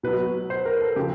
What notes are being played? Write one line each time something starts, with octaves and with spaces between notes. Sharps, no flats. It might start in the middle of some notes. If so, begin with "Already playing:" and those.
B2 F#3 B4
C5
A#4
A4
C#3 F3 G4